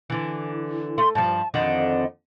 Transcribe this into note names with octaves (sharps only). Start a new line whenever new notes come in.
D3 E3
A3 C6
G2 F3 A5
F2 D3 D#3 D#5